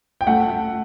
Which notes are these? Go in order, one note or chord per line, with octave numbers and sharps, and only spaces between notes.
G5
A3 F#5
A3